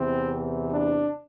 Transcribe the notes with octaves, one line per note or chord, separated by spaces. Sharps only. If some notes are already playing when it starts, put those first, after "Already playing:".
Already playing: E2 C3 E3 C4
D4